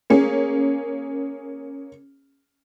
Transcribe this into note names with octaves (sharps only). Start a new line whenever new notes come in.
A#3 C#4 G#4